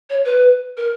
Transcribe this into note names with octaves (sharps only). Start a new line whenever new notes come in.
C#5
B4
A#4